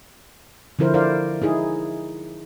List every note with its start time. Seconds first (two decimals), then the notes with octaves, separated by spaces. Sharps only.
0.79 D3 F3 E4 A#4 C5
0.94 E4 A#4 C5 D5 F5
1.42 D#4 E4 G#4